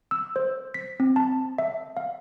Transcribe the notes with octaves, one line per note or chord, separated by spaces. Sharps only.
E6
C5
B6
C4
A5
E5
F5